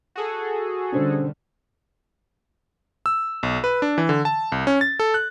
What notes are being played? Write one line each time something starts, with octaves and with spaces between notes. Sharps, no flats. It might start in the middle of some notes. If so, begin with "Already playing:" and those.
F#4 G#4 A4
B2 D3 G3 C#4 D4 C5
E6
B1
B4
D4
E3
D3
A5
C2
C#4
A6
A4
F#6